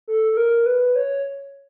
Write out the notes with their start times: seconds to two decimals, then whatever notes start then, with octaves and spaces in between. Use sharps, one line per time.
0.08 A4
0.32 A4
0.37 A#4
0.66 B4
0.96 C#5